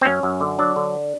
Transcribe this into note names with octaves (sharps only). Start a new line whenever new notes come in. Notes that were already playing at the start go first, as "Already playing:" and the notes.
C4
F#2 C#4
F#2
D3
F#3 D4
D3